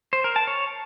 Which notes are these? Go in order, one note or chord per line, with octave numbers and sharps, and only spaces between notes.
C5
A#4
A5
C#5